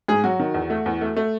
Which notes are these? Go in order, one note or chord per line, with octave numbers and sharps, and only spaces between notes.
G#2 G#4
F#3 F#4
D#3
E2
A3
E2
A3
A3